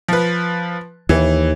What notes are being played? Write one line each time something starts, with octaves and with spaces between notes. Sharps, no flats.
F3 B4
D#2 E3